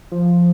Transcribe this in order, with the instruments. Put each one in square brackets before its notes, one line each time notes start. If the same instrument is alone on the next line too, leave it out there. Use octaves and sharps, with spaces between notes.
[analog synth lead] F3